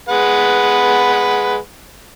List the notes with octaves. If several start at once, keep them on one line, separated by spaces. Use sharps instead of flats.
G#3 B4 F#5